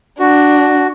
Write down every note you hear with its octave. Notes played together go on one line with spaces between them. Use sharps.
D4 F#4